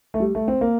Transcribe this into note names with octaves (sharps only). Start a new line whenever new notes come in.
A3
G3
A3
C4
A#3